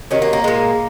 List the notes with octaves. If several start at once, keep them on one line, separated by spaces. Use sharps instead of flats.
C3 D#3 F#3 C#4
A#3
A#3
A#2 G#3